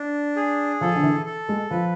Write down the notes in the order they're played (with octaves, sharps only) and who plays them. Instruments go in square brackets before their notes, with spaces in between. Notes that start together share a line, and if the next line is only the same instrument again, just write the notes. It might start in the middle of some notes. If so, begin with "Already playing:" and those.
Already playing: [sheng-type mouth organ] D4
G#4
[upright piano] F3 [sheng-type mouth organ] A4
[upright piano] D3
E3
[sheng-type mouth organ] A4
[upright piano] G#3
[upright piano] F3 [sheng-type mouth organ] B4